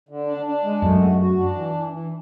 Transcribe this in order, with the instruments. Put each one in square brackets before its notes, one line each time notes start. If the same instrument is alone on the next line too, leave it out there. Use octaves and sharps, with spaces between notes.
[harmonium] D3
D4
D4
G#3
[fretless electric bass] F#2 [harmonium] A3
[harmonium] F#4
F#4
D4
E3
E3
E3